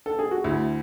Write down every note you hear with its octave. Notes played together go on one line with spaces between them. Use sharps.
A4
G#4
F#4
D2 E4